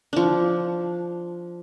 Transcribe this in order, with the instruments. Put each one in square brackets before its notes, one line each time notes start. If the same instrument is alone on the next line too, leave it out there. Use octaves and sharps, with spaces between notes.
[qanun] F3 D4